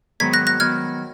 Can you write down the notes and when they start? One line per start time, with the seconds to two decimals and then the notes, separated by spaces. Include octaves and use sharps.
0.20 G#2 D#3 F#3 B3 G#6 B6
0.33 F#6 A#6
0.47 F#6 A#6
0.60 D#3 F#3 B3 F6 G#6